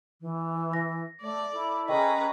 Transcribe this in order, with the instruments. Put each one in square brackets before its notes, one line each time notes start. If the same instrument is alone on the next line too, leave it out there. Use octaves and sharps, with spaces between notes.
[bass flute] E3
[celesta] A#6
[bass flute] A3 [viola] D5
[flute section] E4 [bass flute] A4
[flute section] C#4 G#4 C#6 [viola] B4 A#5 [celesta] D#5 G5